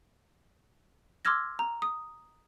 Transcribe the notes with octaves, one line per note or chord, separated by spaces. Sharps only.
C6 D6 E6 F6 G#6 A#6
A#5
D#6